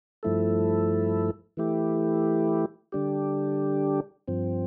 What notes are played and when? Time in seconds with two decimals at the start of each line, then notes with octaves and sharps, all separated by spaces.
0.23 G2 F3 A3 E4 A4
1.57 E3 A3 E4 G4
2.92 D3 G3 D4 G4
4.28 G2 F3 C4